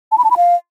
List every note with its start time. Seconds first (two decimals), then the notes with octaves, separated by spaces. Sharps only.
0.12 A5
0.18 B5
0.24 A5
0.31 B5
0.37 F5